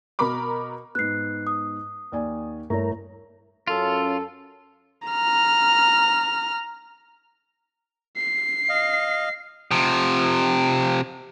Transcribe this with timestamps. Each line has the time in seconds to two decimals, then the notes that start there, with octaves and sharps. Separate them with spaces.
0.19 B2 A#4 A#5 B5 D6
0.95 G#2 B3 F#6 C7
1.47 D#6
2.12 D#2 D5 G#5
2.70 G2 A3 E4 A#4 C#5 A#5
3.67 F#2 C#4 F4 A4
5.08 A#5 F6
8.17 C7
8.69 D#5 F5
9.71 C3 F3